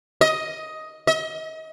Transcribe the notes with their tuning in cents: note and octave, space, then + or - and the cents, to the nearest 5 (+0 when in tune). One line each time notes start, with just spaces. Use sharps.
D#5 +10
D#5 +35